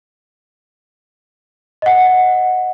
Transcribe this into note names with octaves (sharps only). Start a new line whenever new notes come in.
D#5 F#5